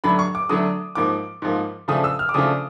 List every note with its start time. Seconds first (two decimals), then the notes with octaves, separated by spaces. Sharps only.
0.04 D3 F#3 A3 D4 B5
0.19 C#6
0.35 D6
0.49 D3 F#3 A3 D4 D#6
0.95 G#2 F3 A#3 D6
1.42 G#2 F3 A#3
1.88 C#3 F3 A3 D4 D#6
2.04 E6
2.19 F6
2.29 D6
2.34 C#3 F3 A3 D4 D#6